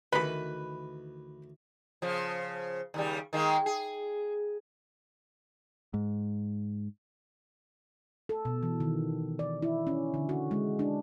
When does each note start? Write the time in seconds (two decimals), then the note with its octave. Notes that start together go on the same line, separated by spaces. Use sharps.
0.13 D2 D#3 E3 B4 B5
2.02 C#3 F3
2.94 D#2 C#3 G3
3.33 D#3 G#3 A#3
3.66 G#4
5.94 G#2
8.29 A4
8.45 B2
8.63 E3
8.80 D#3
9.39 D5
9.63 E4
9.87 C#4
10.14 D3
10.29 F#4
10.51 G#3
10.79 D4